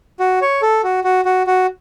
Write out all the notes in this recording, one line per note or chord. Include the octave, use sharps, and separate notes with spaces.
F#4
C#5
A4
F#4
F#4
F#4
F#4